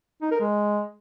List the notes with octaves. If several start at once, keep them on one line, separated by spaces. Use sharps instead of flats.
D#4
A#4
G#3